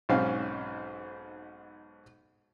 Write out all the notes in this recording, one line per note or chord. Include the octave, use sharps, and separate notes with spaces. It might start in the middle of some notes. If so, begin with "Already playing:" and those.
B1 G#2 C4 C#4 F5